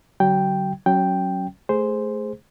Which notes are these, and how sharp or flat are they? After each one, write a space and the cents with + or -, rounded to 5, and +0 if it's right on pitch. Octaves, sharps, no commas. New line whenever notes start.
D3 -15 F#3 +35 G5 +0
F#3 +10 C#4 -15 G5 +0
A3 -15 G#4 +0 C5 +0